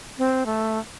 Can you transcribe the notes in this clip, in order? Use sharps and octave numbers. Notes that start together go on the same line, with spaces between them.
C4
A3